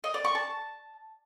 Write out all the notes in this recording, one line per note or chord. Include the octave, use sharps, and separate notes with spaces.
D#5
D5
C#6
A5